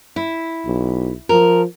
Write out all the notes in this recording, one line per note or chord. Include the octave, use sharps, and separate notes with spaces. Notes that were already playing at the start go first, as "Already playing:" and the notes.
E4
B1
F3 A#4